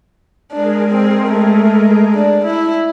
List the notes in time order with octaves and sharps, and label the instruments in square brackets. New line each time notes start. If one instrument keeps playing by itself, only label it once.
[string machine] G#3 G#4 A#4 [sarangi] D4
[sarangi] C4
A3
D4
E4